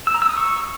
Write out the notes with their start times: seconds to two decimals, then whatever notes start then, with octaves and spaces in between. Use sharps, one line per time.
0.07 E6
0.14 A#5
0.22 E6
0.29 D#6
0.37 C#6